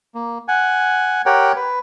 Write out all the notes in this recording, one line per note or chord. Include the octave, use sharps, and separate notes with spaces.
A#3
F#5 G#5
G4 A#4 C#5 F#5 G5
B4